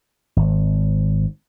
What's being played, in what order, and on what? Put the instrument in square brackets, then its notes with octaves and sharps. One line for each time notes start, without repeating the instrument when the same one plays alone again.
[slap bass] G#1